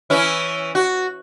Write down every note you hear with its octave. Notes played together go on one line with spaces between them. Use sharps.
E3 C#4 E4
F#4